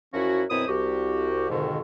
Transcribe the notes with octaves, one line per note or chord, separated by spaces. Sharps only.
F#2 F3 C#4 E4 F#4
F#2 B2 C4 E4 C5 D#6
C2 F#4 G4
F2 G#2 B2 D3 D#3